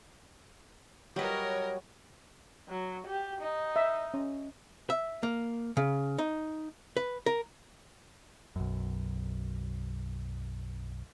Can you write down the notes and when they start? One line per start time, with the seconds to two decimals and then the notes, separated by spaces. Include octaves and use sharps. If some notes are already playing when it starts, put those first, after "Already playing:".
1.16 F#3 G3 A#4 B4 C#5 D#5
2.69 F#3
3.07 G4
3.41 D#4
3.76 E5
4.14 C#4
4.90 E5
5.23 A#3
5.77 C#3
6.18 D#4
6.97 B4
7.26 A#4
8.56 B1 F#2